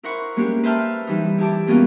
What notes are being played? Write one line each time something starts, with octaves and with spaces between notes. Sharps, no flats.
E4 A#4 C5 F#5 B5 C#6
G#3 A#3 C#4 D4 G4
B4 C5 E5 G5 A5 F6
E3 G3 D#4
E4 G4 A5 D6
G3 A#3 B3 C#4 F4 F#4